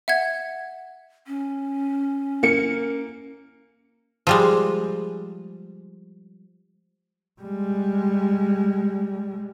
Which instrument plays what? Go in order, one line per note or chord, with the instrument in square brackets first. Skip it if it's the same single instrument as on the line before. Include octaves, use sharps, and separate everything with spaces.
[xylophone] E5 F#5 G#6
[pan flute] C#4
[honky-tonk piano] A#3 C#7
[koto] F3 G3 G#3
[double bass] G3 G#3